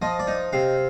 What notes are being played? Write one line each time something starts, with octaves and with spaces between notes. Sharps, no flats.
F3 D#5
D5
D#4
C3 F5